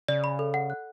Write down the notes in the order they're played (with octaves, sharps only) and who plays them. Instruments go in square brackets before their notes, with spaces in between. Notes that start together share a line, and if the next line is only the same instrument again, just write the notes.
[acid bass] C#3 [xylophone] D5
[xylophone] B5
A4
F#5
F#6